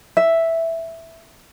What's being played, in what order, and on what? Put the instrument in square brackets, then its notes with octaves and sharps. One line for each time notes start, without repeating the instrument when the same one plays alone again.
[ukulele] E5